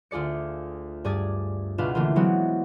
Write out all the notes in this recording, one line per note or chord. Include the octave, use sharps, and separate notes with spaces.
D2 F4 G#4 D5 C#7
G2 G#4 D5 G#6 A6
C#2 B2 D4 F4 B4 F5
D3 E3 A3 A#3 F4
E3 F#3 G#3 B3 C4